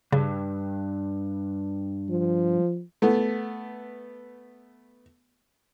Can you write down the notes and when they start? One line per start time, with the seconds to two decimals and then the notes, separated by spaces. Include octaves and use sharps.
0.12 G2 C#3
2.09 F3
3.02 A3 B3